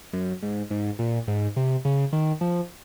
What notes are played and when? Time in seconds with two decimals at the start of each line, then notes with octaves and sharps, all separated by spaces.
0.13 F#2
0.43 G#2
0.71 G#2
0.99 A#2
1.28 G#2
1.56 C3
1.85 C#3
2.13 D#3
2.41 F3